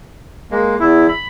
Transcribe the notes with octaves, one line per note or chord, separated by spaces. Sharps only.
G#3 A#3
E2 E4
B5